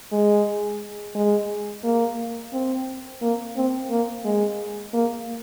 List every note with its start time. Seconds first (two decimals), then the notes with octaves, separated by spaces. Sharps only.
0.12 G#3
1.15 G#3
1.84 A#3
2.53 C4
3.22 A#3
3.57 C4
3.90 A#3
4.25 G#3
4.93 A#3